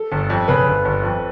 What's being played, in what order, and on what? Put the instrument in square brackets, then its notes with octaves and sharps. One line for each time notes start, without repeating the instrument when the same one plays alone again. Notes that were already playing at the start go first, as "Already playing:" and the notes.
Already playing: [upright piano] A4
[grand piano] G1
F2
[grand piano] C#3 [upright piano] B4
[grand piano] G1
G1
F2